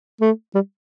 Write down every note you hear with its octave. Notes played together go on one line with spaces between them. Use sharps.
A3
G3